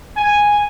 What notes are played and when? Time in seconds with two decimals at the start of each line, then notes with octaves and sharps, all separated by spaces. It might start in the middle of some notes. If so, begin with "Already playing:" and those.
0.16 G#5